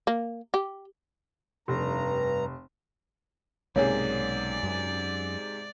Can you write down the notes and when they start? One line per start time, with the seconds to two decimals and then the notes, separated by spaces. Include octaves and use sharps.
0.07 A#3
0.54 G4
1.68 F1 G2 A#5
3.76 B1 G#2 C3 A#3 C#4 G#4 C#5 D5
4.63 F#2